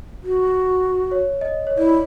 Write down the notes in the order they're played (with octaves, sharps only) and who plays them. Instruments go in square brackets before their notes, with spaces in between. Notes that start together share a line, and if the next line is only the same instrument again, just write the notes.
[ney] F#4
[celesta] C#5
D#5
C#5
[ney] E4 [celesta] D5
[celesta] D5